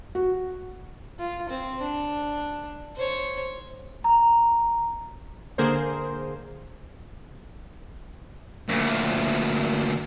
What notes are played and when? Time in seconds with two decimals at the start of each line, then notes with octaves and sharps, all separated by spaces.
0.15 F#4
1.19 F4
1.49 C4 C5
1.81 D4
2.96 C5 C#5
4.04 A#5
5.58 D3 A#3 G#4 A#4 C5
8.69 D2 A#2